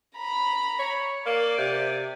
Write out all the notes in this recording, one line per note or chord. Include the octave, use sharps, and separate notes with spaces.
A#5 B5
C#5
A#3 D5
C3